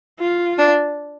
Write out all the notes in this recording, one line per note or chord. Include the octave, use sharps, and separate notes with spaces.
F4
D4